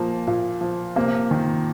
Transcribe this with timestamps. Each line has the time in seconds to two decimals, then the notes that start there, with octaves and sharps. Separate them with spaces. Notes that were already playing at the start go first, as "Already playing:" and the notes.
Already playing: A#2 F3 A#3
0.27 A#2
0.61 F3
0.96 C3 A#3
1.31 D#3